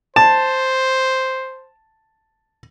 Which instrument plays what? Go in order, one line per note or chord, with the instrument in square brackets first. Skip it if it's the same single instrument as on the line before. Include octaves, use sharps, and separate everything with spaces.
[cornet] C5 [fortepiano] A5